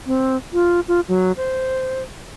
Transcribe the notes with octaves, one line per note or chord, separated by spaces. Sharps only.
C4
F4
F4
F#3
C5